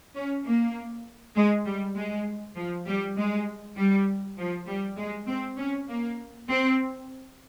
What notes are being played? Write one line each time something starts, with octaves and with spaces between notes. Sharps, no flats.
C#4
A#3
G#3
G3
G#3
F3
G3
G#3
G3
F3
G3
G#3
C4
C#4
A#3
C4